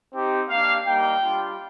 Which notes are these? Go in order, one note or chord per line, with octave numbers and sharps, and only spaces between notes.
C4 D#4 G4
A#3 D4 G4 F5
G3 A#3 D#4 G5
G3 D4 F4